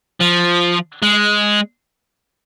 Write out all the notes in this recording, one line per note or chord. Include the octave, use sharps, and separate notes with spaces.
F3
G#3